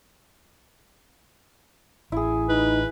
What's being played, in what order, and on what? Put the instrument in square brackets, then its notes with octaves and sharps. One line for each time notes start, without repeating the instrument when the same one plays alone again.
[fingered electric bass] A1 [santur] E4 G#4
[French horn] D#4 [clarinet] B4